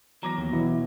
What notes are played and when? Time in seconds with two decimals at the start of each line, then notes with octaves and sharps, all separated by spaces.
0.23 E2 F#3 A#5 D6 A#6
0.38 D#2
0.53 B2 E3 E4